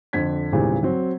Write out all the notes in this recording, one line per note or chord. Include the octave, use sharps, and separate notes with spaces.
F2 D3 G#6 B6
G#1 E2 A#2 C#3 G3
F#3 C4